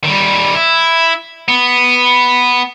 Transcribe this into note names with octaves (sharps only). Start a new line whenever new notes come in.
D#3 G3
E4
B3